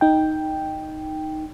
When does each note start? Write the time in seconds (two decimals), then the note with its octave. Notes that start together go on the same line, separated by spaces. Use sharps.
0.01 D#4 G5